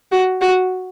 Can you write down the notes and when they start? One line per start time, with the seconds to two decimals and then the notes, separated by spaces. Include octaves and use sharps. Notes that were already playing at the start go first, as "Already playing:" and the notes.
0.11 F#4
0.41 F#4